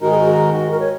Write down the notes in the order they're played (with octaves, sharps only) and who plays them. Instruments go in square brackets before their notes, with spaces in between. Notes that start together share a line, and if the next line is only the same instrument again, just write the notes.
[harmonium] G#2 D#3 G#3 D#4 A#4 [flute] F#4
[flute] G#4
F#4
A#4
C#5